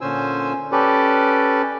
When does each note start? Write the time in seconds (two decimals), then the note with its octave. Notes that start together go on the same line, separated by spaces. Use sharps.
0.01 A#2 D3 C#4 C5 G#5 E6
0.72 C#4 G4 A4 B4 D5